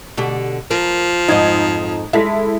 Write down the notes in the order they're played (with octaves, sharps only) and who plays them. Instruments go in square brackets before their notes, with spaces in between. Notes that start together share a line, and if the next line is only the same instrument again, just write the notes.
[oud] B2 D3 G4
[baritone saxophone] F3 [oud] A#4
[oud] F2 G#2 D#5 [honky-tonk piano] D#4 G#6
[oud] G#3 [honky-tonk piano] E4 A4 B6